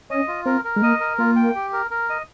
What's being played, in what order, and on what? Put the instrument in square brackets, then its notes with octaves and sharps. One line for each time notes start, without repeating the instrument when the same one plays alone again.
[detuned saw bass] C#4 [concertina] D#5
[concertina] F4
[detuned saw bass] C4 [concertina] A#4
[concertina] A#4
[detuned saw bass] G#3
[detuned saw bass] A#3 [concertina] D#5
[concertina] A#4
[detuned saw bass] A#3 [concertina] F4
[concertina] G5
G4
A#4
A#4
D#5